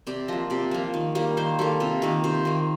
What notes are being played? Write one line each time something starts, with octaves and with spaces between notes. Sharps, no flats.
C3 D5
F3 A#3 D#5
C3 D5
F3 A#3
D#3
G3 A#3
D#3 C5
G3 A#3 A4
C3 F4
D#3 A#3
C3 C5
D#3 A#3